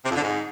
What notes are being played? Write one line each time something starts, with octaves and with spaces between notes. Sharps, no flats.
C3
F2
D3
G#2